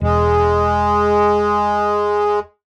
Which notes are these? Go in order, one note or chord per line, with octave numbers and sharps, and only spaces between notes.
E1 G#3